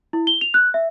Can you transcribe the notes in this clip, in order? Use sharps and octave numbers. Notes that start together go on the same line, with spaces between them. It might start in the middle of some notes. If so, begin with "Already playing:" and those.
E4
G7
F7
F#6
E5